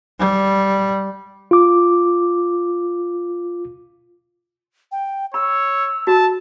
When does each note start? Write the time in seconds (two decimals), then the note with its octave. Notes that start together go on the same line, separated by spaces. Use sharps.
0.19 G3
1.51 F4 D6
4.92 G5
5.34 C#5 B5 E6
6.07 F#4 A5